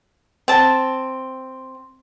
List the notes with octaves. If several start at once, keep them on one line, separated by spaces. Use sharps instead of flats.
C4 A5